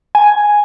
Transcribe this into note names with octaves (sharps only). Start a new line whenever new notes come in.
G#5